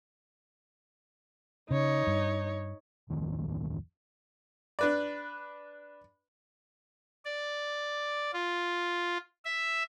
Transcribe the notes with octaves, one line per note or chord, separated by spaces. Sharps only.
C#3 D#4 C#5
G2
D1 A1 F2 D#3
D4 B4 D5
D5
F4
E5